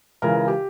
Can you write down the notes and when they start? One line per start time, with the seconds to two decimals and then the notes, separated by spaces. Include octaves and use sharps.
0.22 C#2 C#3 E3 A#4
0.48 G4